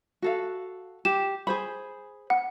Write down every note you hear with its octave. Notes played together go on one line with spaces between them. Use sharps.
F#4 A4 F5
G4 E7
G#4 C5 B5
F#5